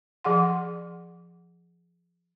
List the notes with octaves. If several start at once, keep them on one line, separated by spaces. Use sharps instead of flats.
F3 G#4 F#5 C6